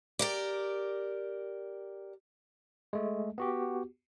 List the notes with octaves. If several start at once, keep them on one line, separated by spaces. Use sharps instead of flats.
G4 A#4 D5
G#3 A3
B3 F#4 G4